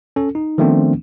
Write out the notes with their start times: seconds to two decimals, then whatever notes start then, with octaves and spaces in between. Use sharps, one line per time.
0.16 C#4 A4
0.35 D#4
0.58 D#3 F3 A3 B3 C4 D4